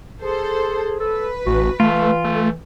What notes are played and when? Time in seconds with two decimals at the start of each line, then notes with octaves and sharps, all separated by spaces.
0.22 G#4 A4 C5
1.00 A4 B4
1.46 A1 F#4
1.80 E3 A3 F4
2.24 A3